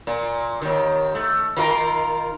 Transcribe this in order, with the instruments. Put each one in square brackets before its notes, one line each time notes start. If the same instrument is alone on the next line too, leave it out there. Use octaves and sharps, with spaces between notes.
[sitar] A#2
D#2 D#3
A3
D#3 F4 A#4